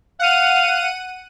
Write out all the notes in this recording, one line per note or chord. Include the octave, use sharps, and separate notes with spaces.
F5 F#5 D#7